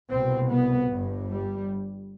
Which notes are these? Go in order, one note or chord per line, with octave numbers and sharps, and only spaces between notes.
C2 B2 C4
B3
G1 G2
G3